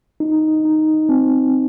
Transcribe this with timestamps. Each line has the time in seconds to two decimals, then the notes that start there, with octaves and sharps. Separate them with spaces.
0.20 D#4
0.65 D#4
1.09 C4